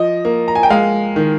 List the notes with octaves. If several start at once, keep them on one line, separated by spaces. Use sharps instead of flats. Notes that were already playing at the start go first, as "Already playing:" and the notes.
Already playing: F3 D#5
A#3
A#5
G#5
G5
G#3 F5
D#3